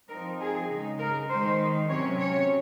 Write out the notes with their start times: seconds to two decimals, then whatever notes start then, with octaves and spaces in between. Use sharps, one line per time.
0.10 F3 C4 D#4 A#4
0.40 G#4
0.69 C#3 G#3 D#4
0.99 A#4
1.29 D#3 G#3 D#4 C5
1.89 C3 F#3 C#4 C#5
2.19 C#5